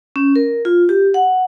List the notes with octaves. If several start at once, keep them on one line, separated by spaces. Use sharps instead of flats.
C#4
A#4
F4
G4
F#5